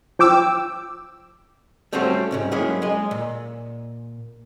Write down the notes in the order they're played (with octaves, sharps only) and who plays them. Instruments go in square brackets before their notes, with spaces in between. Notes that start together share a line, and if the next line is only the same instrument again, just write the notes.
[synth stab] F3 G5 D6 E6
[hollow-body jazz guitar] G3 A3 C4 C#4 F#4 C5
C2 G#2 C#3
F#3 G#3 A#3 C#4 E4 G#4
G#3 D#5
A#2